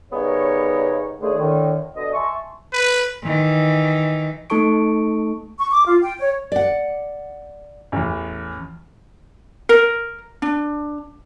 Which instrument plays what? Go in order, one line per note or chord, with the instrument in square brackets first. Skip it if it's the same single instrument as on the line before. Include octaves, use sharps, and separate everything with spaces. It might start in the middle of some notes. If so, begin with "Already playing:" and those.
[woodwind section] C#3 G3 B3 D#4 A#4 C#5
D#2 D3 A3 G#4
A2 D3 D#3
B2 D3 D#5
E5 G#5 A5 C6 C#6
[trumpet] B4
[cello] D#3 E3
[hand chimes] A3 D#4 A4 A5 C#6 D7
[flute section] C#6
D6
F4
G5
C#5
[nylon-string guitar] D5 F#5
[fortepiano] A1 E2
[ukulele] A#4
D4